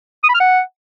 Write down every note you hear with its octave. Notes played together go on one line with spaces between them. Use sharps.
D#6
B5
F6
F#5